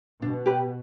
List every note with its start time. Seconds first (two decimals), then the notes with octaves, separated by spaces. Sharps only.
0.22 B2 D4
0.46 G4 B4